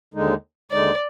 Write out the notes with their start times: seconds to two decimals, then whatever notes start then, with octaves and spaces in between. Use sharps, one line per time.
0.14 D#2 D3 G#3 D#4
0.71 D#2 D3 G#3 D#4 D5